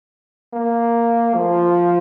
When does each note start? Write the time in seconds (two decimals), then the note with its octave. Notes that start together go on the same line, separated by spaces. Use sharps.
0.53 A#3
1.34 F3